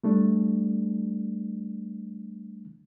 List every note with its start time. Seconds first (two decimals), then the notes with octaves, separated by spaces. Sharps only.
0.04 G3 A3 D4